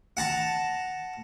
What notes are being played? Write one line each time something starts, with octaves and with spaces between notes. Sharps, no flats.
F#5 A5 A#5